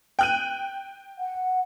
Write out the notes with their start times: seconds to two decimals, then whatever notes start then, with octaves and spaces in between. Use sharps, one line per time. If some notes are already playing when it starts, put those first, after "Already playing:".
0.19 G5 F#6 D#7
1.19 F#5